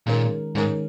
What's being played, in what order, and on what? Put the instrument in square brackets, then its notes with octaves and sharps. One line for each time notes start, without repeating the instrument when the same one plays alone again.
[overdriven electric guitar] A#2 [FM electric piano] D#3 G#3 C#4 A#4
[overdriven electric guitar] G#2 [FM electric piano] D#3 G#3 C#4 A#4